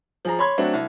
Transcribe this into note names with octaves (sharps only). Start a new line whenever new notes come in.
F3 G#4 A#5
C#5 B5 C6 G#6
F#3 A3 C4 D4 F#4
C2